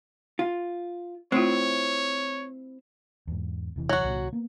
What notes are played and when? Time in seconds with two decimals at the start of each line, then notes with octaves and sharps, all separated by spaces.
0.39 F4
1.32 A3 C4 E4 F4 C#5
3.27 E2 G#2
3.76 E1 C3 E3
3.89 F#3 F#4
4.04 C2 A#2 D3
4.33 A#3 B3